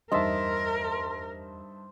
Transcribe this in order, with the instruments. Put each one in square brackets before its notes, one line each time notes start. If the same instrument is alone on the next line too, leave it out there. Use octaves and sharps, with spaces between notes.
[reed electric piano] E2 D#5 [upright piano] G2 D#4 E5 [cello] A#4 [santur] C5 A5